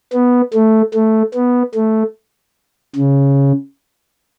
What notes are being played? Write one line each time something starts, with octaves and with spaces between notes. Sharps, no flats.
B3
A3
A3
B3
A3
C#3